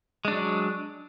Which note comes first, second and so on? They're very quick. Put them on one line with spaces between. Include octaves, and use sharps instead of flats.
G#3 D4 F#3